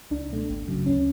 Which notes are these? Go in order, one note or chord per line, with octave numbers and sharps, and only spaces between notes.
C#2 D4
B2 A3
G#1
F#2 C#3 F#3
D2 C#4